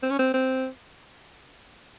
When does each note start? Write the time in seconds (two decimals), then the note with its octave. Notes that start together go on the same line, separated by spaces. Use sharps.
0.03 C4
0.10 C#4
0.19 C4
0.34 C4